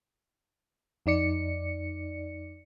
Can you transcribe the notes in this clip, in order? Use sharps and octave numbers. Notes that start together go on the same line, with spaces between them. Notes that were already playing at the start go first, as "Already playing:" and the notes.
F2 D#4 D5 C#7